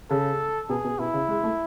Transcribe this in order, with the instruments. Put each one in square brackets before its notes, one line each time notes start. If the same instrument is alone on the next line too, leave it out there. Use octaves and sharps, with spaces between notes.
[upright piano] C#3 [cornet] A4
[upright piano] B2 [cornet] G#4
[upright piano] B2
[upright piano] B2 [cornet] E4
[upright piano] C#3
G#3
A3